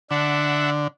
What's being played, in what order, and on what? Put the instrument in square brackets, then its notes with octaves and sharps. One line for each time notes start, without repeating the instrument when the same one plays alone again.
[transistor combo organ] D3 [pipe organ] D4 E5 F#5